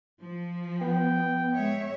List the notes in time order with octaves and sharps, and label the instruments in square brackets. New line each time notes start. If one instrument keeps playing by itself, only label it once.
[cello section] F3
[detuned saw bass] B3 [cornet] G5
[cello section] G#3 C#5 E5